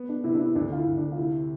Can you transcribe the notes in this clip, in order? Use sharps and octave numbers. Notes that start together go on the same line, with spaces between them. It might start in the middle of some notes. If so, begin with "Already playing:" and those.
Already playing: B3
D4
C3 E4
D4
E4
D2 D4
F4
E4
D2
D4
F4
C3 E4